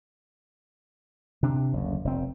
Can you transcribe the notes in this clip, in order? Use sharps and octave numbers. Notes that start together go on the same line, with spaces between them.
C3 D4
F#1 D2
F1 C4